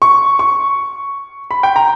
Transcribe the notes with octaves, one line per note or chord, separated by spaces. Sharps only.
C#6
C#6
B5
G5
A#5